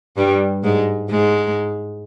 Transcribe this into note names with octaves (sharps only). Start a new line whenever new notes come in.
G2 G3
G#2 G#3
G#2 G#3